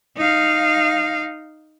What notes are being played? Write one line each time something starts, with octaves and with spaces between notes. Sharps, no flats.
D#4 F5